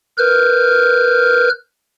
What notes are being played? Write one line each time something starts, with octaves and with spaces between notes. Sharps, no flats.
A#4 B4 F6 G6